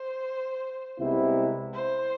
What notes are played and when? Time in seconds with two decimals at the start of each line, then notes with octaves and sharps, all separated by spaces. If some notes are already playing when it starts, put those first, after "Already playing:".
Already playing: C5
0.99 C2 C3 G#3 B3 E4
1.73 C5